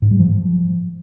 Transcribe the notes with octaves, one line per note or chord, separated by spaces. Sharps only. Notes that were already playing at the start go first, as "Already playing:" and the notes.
G#2
G3
F3